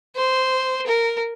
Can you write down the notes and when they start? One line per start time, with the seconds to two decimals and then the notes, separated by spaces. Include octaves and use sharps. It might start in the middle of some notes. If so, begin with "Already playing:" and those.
0.16 C5
0.86 A#4